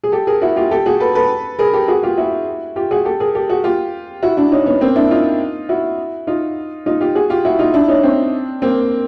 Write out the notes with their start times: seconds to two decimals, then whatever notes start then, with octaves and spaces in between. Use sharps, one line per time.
0.04 G#4
0.12 G4 A4
0.27 G#4 A#4
0.42 E4 F#4
0.56 F4 G4
0.71 G4 A4
0.86 F#4 G#4
1.00 A4 B4
1.15 A4 B4
1.59 G#4 A#4
1.73 G4 A4
1.88 F#4 G#4
2.03 F4 G4
2.17 E4 F#4
2.76 F4 G4
2.91 F#4 G#4
3.05 G4 A4
3.20 G#4 A#4
3.35 G4 A4
3.50 F#4 G#4
3.64 F4 G4
4.22 E4 F#4
4.37 D4 E4
4.52 C#4 D#4
4.66 B3 C#4
4.81 A#3 C4
4.96 D4 E4
5.11 D#4 F4
5.69 E4 F#4
6.27 D#4 F4
6.86 D#4 F4
7.01 F4 G4
7.15 F#4 G#4
7.30 F4 G4
7.45 E4 F#4
7.59 D#4 F4
7.74 D4 E4
7.88 C#4 D#4
8.03 C4 D4
8.62 A#3 C4